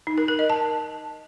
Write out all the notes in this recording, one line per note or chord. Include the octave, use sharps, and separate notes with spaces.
D#4
A#4
A#4
D#5
A5